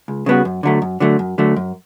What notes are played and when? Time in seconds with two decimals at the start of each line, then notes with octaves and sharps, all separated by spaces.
0.08 C#2
0.26 C#3 G3 B3 F#4
0.45 F#2
0.63 D3 F#3 A3
0.82 F#2
1.00 D3 F#3 A3
1.19 F#2
1.38 D3 F#3 A3
1.56 F#2